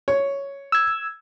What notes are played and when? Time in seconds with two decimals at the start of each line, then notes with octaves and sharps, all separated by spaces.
0.08 C#5
0.72 E6 G#6